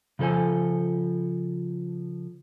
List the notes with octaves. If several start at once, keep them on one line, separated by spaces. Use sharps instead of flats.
C#3 F3 A4 C5 G#5